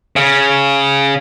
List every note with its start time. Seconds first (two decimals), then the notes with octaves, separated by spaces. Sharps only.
0.16 C#3